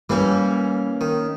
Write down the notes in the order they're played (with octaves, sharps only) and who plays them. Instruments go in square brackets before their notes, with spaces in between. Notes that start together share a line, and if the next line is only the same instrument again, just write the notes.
[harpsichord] E3 G3 [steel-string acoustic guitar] A#3 C#4
[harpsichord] D#3